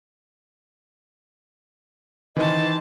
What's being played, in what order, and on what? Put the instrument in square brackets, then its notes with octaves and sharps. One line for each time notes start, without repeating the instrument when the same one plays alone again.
[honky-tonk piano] D#3 [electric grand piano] E3 [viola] C5 A5 [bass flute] D#5